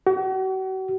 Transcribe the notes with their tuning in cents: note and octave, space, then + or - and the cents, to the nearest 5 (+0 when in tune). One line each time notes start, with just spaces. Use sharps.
F#4 +40